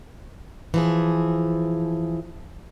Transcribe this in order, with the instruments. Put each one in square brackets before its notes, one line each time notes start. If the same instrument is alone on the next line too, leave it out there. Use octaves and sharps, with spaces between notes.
[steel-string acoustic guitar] E3 F3 G#4